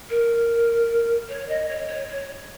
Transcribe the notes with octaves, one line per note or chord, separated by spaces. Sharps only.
A#4
C#5
D#5
C#5
C#5
C#5